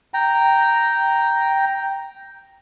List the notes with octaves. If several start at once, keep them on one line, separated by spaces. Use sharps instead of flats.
G5 A#5